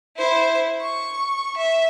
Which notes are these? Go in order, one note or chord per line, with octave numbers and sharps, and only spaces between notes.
E4 C5
C#6
E5